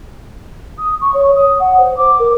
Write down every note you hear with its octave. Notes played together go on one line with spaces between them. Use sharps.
D#6
C#6
C#5
D#6
F#5
C5
D6
A#4